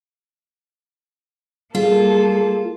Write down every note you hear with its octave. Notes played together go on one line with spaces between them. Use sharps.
G3 A#3 F4 G#4 A4